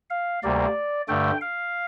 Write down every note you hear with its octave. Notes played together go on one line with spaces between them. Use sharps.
F5
D2 C3 G3 A#3 D5
G2 D3 A3 G5
F5